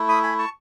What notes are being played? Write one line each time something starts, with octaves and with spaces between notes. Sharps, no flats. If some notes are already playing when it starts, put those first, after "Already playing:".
Already playing: A3 E4
B5 D#6
G#5 B5
A5 C#6